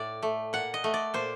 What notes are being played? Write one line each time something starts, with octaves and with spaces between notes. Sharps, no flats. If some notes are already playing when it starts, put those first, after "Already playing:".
Already playing: A2 D5
A3
A#2 F#5
D#5
A3
D5
A#2 C5